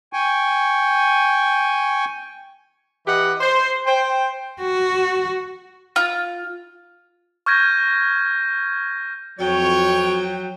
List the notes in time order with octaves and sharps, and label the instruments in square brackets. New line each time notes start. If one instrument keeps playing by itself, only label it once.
[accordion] G5 G#5 C#6
[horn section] E3 G4 D#5 F#5
C5
C5 G5
[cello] F#4
[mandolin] F4
[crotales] C#6 F6 G6 G#6 A#6 D#7
[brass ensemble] F2 C#5 [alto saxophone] F#3 [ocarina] F#4 [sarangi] G5